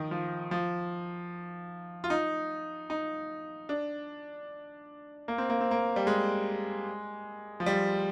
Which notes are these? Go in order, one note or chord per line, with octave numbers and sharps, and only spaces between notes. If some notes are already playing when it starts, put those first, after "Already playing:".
Already playing: D#3 F3
F3
F3
F4
D#4
D#4
D4
A#3
C4
A#3
C4
A#3
G3
G#3
F3
G3